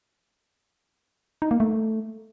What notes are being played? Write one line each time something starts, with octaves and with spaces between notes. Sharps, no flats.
D#4
A#3
A3